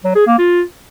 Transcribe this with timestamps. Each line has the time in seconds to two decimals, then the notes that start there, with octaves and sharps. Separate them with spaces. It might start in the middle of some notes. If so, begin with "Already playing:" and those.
0.04 F#3
0.15 G#4
0.27 A#3
0.38 F4